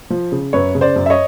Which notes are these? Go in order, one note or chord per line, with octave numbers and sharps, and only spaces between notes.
F3
C#3
F#2 B4 C#5
C#3
C5 D5
F#2
E5
C#5 D#5